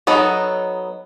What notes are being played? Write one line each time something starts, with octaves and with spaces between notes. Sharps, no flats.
F#3 B3 D#4 A4